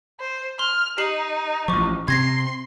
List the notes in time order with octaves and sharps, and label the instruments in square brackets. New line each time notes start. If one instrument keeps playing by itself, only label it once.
[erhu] C5
[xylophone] C6 [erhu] F6
[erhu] D#4 [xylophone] G4 C7 F#7
[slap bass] A1 F3 [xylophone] C#6 D6
[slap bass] C3 C4 [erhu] C6 [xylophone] G#6 A#6 C7